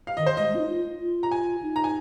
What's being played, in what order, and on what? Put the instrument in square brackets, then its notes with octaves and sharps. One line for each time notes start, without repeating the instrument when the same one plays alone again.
[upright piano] F5
[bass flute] D#3 [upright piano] D#5
[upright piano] C5
[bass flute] G#3 [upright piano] D#5
[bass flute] G#3
F4
D#4
F4
F4
[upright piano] A#5
G#5
[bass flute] D#4
[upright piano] A#5
G#5